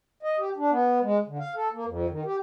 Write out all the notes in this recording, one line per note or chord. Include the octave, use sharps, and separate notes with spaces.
D#5
G4
D4
B3
G#3
D3
F5
A4
A#3
F2
D#3
G4